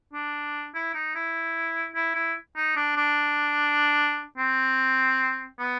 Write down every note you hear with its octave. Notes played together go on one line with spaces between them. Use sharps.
D4
E4
D#4
E4
E4
E4
D#4
D4
D4
C4
B3